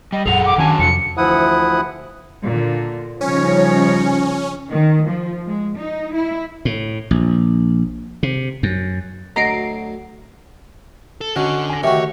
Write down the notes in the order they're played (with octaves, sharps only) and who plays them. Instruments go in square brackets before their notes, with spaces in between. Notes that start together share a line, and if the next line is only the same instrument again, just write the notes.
[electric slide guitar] G3 [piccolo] D#5
[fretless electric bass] A#1 F#2 [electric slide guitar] G#4 A4 F#5 [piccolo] F7
[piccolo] D6
[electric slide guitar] D3 F#3 A5 [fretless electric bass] D#3 C#4 [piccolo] G#5
[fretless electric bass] F2 C3 [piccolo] C#7
[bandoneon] D2 E3 F3 E4 F#5 D#6
[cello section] A#2 D3
[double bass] C#3 F3 [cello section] G3 D#4 C#5 [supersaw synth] C#4
[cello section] D#3
F3
G#3
D#4
E4
[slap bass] A2
A#1
C3
F#2
[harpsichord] D2 F#3 [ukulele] D#5 [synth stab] A#5 C7 D7
[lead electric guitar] A4
[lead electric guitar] D3 [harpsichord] C#4 [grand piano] F#4 D#5
[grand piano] G#5 A#6
[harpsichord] D#3 F#4 [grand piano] A3 G4 [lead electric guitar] C#5 [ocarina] E5